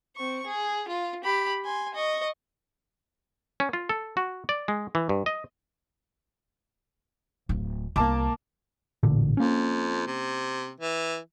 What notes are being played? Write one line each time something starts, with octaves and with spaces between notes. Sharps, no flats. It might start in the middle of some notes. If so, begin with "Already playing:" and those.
C4 C#6
G#4
F4
G4 B5
G#5 C6
D#5 C#6
C#4
F4
A4
F#4
D5
G#3
E3
G2
D#5
D1
C2 A#3 A5 D6
A1 A#2 D3
F2 A#3 C#4
C3
E3